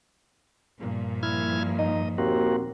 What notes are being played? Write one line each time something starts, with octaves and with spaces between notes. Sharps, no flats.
G2 A#2 F3
E4 F6 G#6
D#4 D#5
D#2 A#3 C4 F#4